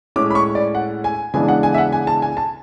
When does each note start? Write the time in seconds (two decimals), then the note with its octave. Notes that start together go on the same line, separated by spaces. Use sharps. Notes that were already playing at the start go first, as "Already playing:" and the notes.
0.16 A2 G#3 C#4 D6
0.30 B5
0.35 C#6
0.55 D5
0.75 F#5
1.04 G#5
1.34 C#3 E3 G#3 B3 D4 G#5
1.48 F#5
1.63 G#5
1.74 E5
1.78 F#5
1.92 G#5
2.07 A5
2.22 G#5
2.37 A5